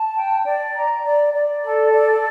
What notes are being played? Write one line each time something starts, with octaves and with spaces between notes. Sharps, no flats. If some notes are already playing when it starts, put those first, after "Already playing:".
Already playing: A5
G5
D5
A#5
D5
D5
A4
D5